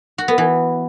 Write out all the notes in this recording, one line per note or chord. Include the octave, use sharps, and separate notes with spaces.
F#4
B3
E3